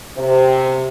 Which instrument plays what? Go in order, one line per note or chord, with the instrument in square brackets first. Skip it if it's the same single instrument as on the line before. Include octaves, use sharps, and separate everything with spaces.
[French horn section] C3